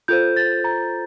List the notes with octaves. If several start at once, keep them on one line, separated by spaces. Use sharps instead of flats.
F4 A4 C5 G6
A6
A#5